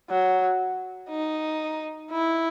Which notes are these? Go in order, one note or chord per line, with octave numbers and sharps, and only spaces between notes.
F#3
D#4
E4